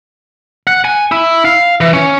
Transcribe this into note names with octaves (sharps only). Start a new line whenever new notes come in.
F#5
G#5
E4
F5
E3
C#4